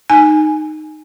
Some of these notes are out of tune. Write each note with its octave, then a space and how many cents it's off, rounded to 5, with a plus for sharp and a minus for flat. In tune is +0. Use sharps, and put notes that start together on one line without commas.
D#4 -10 G#5 +0